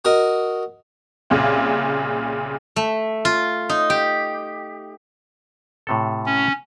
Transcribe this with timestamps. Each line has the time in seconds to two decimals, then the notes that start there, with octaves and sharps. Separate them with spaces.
0.05 F#4 A#4 D#5
1.30 C2 A#2 C#3
2.76 A3
3.25 F4
3.69 D#4
3.90 G4
5.87 A2 C3 A4
6.26 C#4